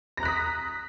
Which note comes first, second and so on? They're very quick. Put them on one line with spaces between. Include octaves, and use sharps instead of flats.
A#6 A#5 F#6 B6 D#6